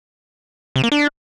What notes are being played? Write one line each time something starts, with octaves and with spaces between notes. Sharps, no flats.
C3
A#3
D4